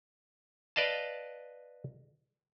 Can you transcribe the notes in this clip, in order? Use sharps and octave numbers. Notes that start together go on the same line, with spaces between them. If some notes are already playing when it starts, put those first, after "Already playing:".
B4 D5 D#5 F5 A5